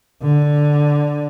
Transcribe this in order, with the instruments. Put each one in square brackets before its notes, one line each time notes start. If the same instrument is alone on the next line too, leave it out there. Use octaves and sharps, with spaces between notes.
[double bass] D3